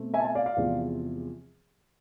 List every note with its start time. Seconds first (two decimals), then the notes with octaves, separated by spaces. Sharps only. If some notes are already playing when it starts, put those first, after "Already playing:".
Already playing: B2 A3 C4
0.14 E5 G#5
0.20 A5
0.24 E5 G#5
0.35 D5 F5
0.46 D5 F5
0.57 E2 C3 F3 G#3 C4